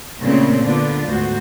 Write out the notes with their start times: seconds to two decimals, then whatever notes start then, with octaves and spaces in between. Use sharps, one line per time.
0.21 A#2 C#3 A3 A#3 C4
0.65 D3 B3 D4 F4
1.06 D2 G#2 F#4 C5